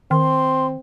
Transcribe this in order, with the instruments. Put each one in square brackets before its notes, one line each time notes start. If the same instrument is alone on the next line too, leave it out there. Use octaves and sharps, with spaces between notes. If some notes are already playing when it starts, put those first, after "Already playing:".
[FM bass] D#3 [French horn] C4 [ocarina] C6